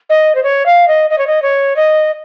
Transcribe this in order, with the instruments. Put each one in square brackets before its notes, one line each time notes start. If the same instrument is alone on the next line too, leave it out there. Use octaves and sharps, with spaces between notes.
[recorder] D#5
C5
C#5
F5
D#5
D#5
C#5
D#5
C#5
D#5